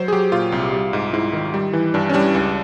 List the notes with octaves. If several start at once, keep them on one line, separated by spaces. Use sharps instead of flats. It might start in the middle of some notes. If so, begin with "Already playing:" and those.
Already playing: F#3 C5
G#4
F#3 G4
A#2 F4
C2
G3
G#2
G#2 E4
D#3
G3
E3
G2 D4
C#4
G3 D4
C#2